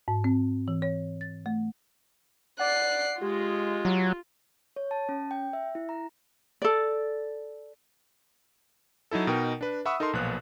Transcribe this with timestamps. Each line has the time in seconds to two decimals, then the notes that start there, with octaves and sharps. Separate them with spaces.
0.08 G#2
0.24 C4
0.68 E3
0.82 C#5
1.21 A6
1.46 A3
2.60 D5 F#5 F#6 C7
3.22 G#3 F4 G4
3.85 F#3
4.76 C#5
4.91 A5
5.09 C#4
5.31 G5
5.53 E5
5.75 E4
5.89 A#5
6.62 A4 D5
9.11 F#3 D#4 E4 A4
9.27 B2 D#4 A#4 G5
9.61 D4 B4
9.85 E5 F#5 B5 C#6 D#6 E6
10.00 D#4 A4 A#4 A5 C6
10.13 B1 A#2 F3 B3 F#6